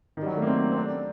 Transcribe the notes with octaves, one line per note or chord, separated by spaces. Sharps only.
D#3
G3
F#3
A3
A#3
C4
C4
D4